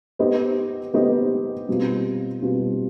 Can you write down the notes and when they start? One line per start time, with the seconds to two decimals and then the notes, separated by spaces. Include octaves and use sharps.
0.19 B3 D#4 G4 C5 D#5
0.94 B3 D#4 G4 C5 D#5
1.68 B2 G3 C4 F4
2.42 B2 G3 C4 F4